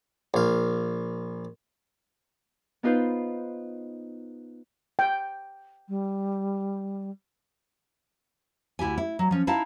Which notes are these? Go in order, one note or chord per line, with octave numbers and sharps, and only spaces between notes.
A#1 F5
B3 D#4 F4 B4 C5
G5
G3
D2 E4 G4 G#5
E4
F#3
F3 C#4
D#4 E4 F5 A5